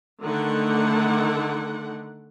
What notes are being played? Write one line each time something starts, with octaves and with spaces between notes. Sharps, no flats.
D3 D#3 A3 F#5